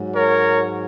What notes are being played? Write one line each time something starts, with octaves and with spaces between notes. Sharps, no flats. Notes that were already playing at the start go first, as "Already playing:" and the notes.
Already playing: G#2 F#3
A#4 C#5